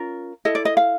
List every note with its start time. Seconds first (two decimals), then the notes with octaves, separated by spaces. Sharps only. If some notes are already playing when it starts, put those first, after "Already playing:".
Already playing: C#4 F4 A#4
0.45 E4 A4 D#5
0.55 D5
0.65 D#5
0.77 F5